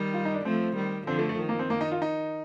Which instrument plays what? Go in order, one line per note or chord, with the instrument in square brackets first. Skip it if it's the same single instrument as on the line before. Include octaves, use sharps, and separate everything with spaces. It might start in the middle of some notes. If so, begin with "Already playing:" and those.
Already playing: [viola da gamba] D#3 G3
[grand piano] F4
D#4
D4
[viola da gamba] F3 A3 [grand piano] C4
[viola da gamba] D#3 G3
[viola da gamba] D3 F3 [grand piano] C4
[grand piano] A3
A3
[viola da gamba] D#3
[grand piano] A#3
C4
A#3
D#4
F4
D#4